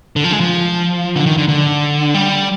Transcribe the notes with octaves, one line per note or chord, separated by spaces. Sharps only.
D3
F3
G#3
F3
D3
D#3
D3
D3
G3